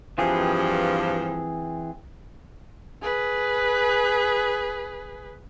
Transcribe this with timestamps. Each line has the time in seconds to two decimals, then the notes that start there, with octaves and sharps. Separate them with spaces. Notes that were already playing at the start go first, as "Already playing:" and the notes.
0.18 G2 E3 F3 C4 G#4
3.02 G#4 B4